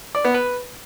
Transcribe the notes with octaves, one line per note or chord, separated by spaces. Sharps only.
D5
B3
B4